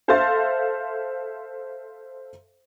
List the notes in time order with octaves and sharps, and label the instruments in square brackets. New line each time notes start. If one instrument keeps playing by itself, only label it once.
[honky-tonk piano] A4 C5 E5 F5 C6 A6